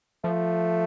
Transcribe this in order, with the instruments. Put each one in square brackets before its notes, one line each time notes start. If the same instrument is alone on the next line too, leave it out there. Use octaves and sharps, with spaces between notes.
[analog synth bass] F3 [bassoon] A3